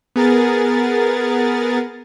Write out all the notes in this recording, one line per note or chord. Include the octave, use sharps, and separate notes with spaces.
B3 G#4 A#4 A6